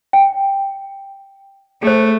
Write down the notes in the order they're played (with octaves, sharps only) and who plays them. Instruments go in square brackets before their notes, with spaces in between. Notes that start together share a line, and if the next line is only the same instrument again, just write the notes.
[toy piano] G5
[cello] A3 [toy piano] G#4 C5